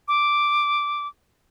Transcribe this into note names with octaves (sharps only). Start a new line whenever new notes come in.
D6